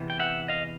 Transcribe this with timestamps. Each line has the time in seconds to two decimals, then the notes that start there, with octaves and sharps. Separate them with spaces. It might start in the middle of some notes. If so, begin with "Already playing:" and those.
Already playing: E2 C3 E3
0.10 G5
0.20 E5 F#5
0.48 D#5 F5